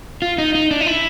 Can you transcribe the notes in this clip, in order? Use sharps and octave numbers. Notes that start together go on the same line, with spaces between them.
F4
D#4
D#4
D4
D#4
E4